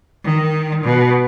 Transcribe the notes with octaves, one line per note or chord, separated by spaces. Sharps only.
D#3
B2